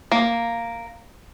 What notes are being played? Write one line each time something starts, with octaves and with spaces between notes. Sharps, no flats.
A#3